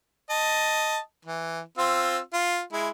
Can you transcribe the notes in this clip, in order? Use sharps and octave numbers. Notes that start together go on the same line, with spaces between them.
D#5 A5
E3
C4 F4 E6
F4
G#3 E4